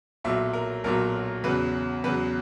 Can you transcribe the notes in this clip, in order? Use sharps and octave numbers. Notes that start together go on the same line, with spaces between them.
B1 A#2 F#3 E5
A#4
B1 A#2 F#3 A#4
E2 C#3 F#3 B4
E2 C#3 F#3 B4